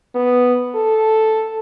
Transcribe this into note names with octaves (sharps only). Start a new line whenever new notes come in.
B3
A4